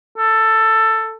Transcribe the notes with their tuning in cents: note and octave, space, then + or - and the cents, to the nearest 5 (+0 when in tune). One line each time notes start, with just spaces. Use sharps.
A4 +10